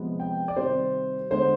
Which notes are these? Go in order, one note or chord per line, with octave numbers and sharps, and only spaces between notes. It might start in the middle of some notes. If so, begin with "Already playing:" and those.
Already playing: C3 F3 G#3 B3
G5
D5
C3 D#3 G3 C5
D3 G#3 B3 C5